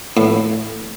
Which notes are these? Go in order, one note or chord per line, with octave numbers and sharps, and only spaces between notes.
A2